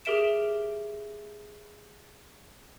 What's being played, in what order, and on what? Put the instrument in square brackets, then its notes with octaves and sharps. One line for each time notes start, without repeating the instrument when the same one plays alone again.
[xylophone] G4 G#4 A#4 E5 D7 E7